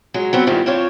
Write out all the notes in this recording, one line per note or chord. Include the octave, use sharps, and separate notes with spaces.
F#3 G#3
F#3 B3 C4
G2 A#2 D#3 E3
C4 D4 F4 C#5